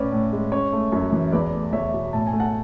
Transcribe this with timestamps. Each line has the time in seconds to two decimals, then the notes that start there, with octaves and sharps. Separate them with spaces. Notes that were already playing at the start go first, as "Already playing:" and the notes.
Already playing: A2 C#4 B4 D5
0.12 A2
0.33 G#3
0.52 C#4 C#5
0.72 A3
0.92 F#2
1.12 E3
1.32 E2 B4 D5
1.53 A3
1.73 E2 C#5 E5
1.93 B2
2.13 A2 A5
2.27 G#5
2.33 A3
2.40 F#5 A5